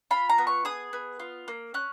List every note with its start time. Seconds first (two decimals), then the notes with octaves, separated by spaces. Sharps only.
0.11 F4 B5
0.30 A#5
0.38 B3
0.47 C#6
0.65 G#4 D#6
0.93 B3
1.20 F4
1.48 A#3
1.74 C#4 F#6